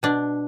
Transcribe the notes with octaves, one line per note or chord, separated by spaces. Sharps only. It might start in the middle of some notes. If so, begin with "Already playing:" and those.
B2 D4